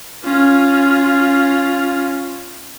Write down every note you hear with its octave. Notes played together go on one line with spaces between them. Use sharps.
C#4 F4